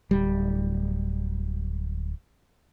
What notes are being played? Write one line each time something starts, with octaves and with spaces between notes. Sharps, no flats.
D1 G3